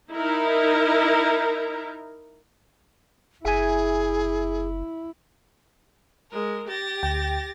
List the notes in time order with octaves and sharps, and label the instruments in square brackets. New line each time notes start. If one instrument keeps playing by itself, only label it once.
[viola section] D#4 E4 A#4
[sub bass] F#1 [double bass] E4 [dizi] G#4 [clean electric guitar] E5 G#5
[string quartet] G#3 A#4
G4 A6 A#6
[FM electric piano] D2 G5